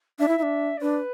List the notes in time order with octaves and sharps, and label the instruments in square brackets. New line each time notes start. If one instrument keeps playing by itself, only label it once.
[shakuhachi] D4 [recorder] E5
[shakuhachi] E4
E4
D4
[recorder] D5
[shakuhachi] D4 [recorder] B4